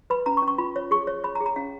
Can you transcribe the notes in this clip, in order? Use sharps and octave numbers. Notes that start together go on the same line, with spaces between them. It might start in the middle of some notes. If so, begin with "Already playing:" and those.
B4 B5
C#4 A#5
C#6
C#4
C#6
F4 B5
C#5
G#4 C#6
C#5
C#5 B5
A#5
G#4
A#5
C#4 F5